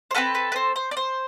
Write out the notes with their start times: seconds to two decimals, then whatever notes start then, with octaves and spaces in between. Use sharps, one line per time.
0.11 C5
0.14 C4 F#4 A4 B4
0.35 B4
0.52 B4
0.56 C5
0.76 C5
0.91 D5
0.97 C5